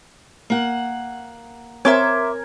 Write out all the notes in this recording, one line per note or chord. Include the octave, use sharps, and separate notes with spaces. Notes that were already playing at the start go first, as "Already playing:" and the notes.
A#3 F#5
C4 A#4 C#5 E5 G#5 C6 D6